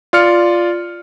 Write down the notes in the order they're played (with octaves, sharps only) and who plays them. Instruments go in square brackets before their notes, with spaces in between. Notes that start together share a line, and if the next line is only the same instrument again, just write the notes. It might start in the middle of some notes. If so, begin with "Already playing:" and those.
[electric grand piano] F4 D5 F6 C#7